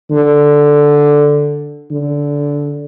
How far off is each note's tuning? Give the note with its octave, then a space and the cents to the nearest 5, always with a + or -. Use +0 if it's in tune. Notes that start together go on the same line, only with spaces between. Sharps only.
D3 +0
D3 -15